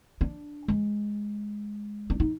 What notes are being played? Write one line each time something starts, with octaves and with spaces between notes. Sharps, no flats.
D4
G#3
D4
D#4